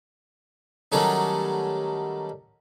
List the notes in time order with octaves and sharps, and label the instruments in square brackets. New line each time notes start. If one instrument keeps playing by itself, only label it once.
[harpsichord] D#3 F#3 G3 A3 C#4 D#4